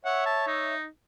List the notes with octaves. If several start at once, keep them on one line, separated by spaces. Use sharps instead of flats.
C#5 E5 F#5
A5
D#4